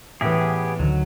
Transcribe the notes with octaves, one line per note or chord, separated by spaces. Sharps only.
A2 E3 B3 G4 G#4
D2 D3 D#3 F#3